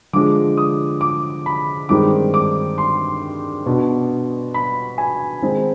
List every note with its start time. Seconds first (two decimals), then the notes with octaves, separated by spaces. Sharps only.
0.13 D3 F3 G#3 D6
0.57 D#6
1.01 D6
1.46 B5
1.89 G2 D#3 G#3 C4 D#4 D6
2.34 D6
2.78 C6
3.66 B2 B3 D4
4.54 B5
4.98 G#5
5.42 D#3 G#3 C4 D#4